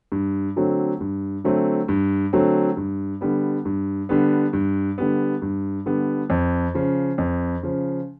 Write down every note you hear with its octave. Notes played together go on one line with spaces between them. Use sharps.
G2
D3 F#3 A3 C4
G2
D3 F#3 A3 C4
G2
D3 F#3 A3 C4
G2
D3 G3 B3
G2
D3 G3 B3
G2
D3 G3 B3
G2
D3 G3 B3
F2
C#3 F3
F2
C#3 F3